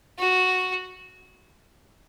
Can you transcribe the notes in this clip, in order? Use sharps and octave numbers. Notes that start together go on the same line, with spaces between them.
F#4